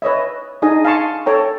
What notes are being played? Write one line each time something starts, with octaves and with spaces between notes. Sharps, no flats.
B4 C#5 D#5 E5
D4 D#4 G#4 D#5 G#5
F5 G#5 A5 C6 C#6
A4 C#5 G5 A#5